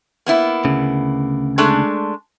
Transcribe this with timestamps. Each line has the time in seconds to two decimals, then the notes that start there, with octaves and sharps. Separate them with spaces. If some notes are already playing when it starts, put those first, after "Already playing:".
0.26 A#3 B3 E4
0.65 D2 C#3
1.58 G#3 A3 D4